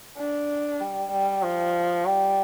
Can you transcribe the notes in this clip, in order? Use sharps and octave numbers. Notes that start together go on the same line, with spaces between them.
D4
G3
G3
F3
G3